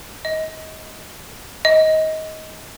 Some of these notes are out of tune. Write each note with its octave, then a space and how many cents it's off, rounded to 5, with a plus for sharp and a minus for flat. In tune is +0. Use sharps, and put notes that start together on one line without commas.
D#5 +25
D#5 +20